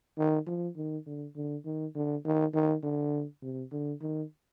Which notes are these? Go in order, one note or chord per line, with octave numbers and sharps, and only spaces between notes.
D#3
F3
D#3
D3
D3
D#3
D3
D#3
D#3
D3
C3
D3
D#3